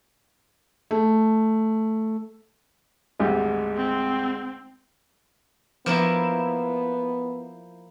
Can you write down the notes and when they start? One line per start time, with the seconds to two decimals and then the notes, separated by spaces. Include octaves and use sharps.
0.91 A3
3.20 G#1 D2 G3 G#3
3.77 C4
5.86 F3 A#3 B3 E4